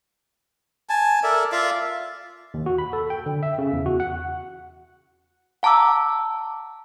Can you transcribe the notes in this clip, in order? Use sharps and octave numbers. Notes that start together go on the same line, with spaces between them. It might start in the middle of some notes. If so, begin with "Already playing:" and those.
G#5 A5
A4 A#4 D5 E5
F4 D5 E5 F5
D#2
F#4
B5
A4
G5
D3
E5
C#3
E2
F#4
F#5
F#5 A5 A#5 D6 E6